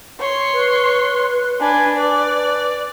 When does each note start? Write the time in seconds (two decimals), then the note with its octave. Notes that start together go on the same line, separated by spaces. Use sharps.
0.20 C#5 C6
0.53 B4
1.60 D4 B4 G#5
1.96 B4 D5